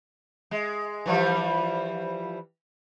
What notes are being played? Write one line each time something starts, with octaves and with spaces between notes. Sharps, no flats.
G#3
E3 F3 G3